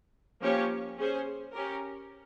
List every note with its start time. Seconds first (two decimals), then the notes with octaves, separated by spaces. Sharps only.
0.42 F3 A#3 C#4 G4 C#5
0.98 C#4 G#4 C5
1.53 C#4 G4 A#4